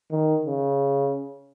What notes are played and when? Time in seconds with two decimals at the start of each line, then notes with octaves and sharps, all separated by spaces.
0.11 D#3
0.45 C#3